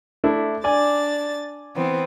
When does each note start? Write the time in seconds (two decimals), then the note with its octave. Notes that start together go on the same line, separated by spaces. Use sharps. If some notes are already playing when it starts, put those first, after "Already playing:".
0.24 A3 D4 E4
0.64 D4 D5 G#5 A6
1.76 E3 B3 C4